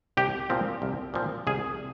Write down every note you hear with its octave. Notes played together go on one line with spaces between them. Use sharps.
C2 G4
A#2 F3 C4
C2
A#2 F3 C4
C2 G#4